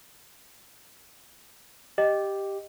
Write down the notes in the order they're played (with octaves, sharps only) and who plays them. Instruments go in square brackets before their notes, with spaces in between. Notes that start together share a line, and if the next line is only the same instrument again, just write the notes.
[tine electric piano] G4 [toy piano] D#5